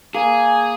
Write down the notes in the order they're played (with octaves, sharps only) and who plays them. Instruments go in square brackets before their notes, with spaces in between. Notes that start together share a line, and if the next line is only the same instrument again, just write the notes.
[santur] A#3 [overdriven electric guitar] G#4